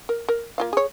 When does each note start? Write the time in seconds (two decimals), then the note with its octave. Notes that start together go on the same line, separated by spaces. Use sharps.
0.09 A#4
0.28 A#4
0.58 A#3 F4 F5
0.73 G#4 C#5